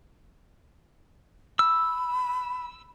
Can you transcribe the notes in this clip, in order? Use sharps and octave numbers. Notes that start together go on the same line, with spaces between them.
B5 E6